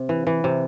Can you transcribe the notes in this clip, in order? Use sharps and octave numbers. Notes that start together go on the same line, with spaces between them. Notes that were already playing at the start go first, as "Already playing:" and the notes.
Already playing: C3
E3
E3
C3